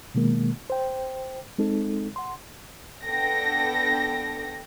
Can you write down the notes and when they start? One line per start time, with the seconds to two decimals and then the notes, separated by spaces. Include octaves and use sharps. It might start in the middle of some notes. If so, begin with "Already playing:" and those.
0.15 B2 D#3 G#3 A#3
0.70 C5 G5
1.59 G#3 C4 D#4 A4
2.16 F#5 C6
3.04 B3 D4 A4 G5 A#6